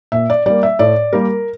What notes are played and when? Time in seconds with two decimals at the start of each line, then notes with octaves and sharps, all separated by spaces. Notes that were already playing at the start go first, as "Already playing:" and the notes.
0.12 A#2 E5
0.30 D5
0.46 G3 A#3 D5
0.63 E5
0.79 A2 D5
1.13 G3 A#3 A#4